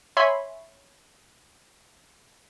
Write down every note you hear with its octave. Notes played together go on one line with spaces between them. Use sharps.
C#5 E5 G#5 B5 C6